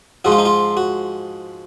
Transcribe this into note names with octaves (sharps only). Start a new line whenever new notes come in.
G#2 F3 G#3 F#4
F4
D#4
F4
F#4